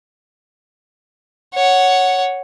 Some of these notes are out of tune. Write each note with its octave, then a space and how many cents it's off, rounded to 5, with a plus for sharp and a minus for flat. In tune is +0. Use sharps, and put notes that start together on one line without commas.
C#5 +0 F#5 +0